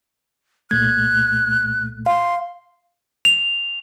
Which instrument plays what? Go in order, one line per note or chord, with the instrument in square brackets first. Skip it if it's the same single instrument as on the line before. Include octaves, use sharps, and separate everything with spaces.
[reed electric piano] C2 A#2 A3 [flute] F#6 [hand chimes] G#6
[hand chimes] F5 [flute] C6
[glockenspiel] F7